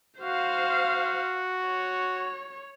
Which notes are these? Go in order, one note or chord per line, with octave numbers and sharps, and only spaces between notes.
F#4 C5 F5
C#5